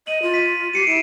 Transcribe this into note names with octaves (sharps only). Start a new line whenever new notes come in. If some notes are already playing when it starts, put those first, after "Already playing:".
D#5 D#7 F#7
F4
B6 D#7
G4 C7 C#7 D#7
E4 D7 E7